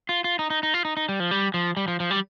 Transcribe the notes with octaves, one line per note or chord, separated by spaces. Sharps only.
F4
F4
D#4
D#4
D#4
F4
D#4
D#4
G3
F3
G3
F3
G3
F3
F3
G3